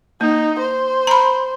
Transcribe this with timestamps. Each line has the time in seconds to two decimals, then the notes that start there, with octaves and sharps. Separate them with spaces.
0.21 A#3 D#4
0.59 C5
1.07 A#5 B5